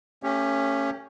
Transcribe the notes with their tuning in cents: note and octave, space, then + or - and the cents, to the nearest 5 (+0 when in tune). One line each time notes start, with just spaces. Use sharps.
A3 +40 C#4 +0 G4 +20